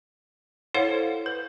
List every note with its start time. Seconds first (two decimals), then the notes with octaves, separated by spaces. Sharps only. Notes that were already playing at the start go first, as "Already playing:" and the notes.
0.74 E4 A4 C5 C#5 F5 F#5
1.26 B4